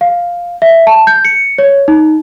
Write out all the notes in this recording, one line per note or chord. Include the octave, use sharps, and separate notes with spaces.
F5
E5
A5
G6
C#7
C#5
D#4